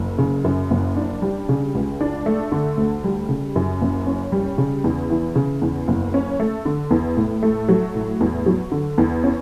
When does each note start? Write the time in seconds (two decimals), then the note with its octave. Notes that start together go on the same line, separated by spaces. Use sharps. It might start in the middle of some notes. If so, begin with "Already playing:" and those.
Already playing: F#1
0.18 C#3
0.44 F#2
0.71 F#1
0.97 D4
1.22 G3
1.49 C#3
1.75 C#2
2.01 D4
2.26 A3
2.52 D3
2.77 D2
3.04 G3
3.29 C#3
3.56 F#2
3.81 F#1
4.07 C#4
4.32 G3
4.58 C#3
4.84 E2
5.10 E3
5.36 C#3
5.62 E2
5.88 F#1
6.14 C#4
6.40 A3
6.65 D3
6.91 E2
7.17 A2
7.43 A3
7.68 F#3
7.95 A2
8.21 E2
8.46 F#3
8.72 D3
8.98 E2
9.24 C#4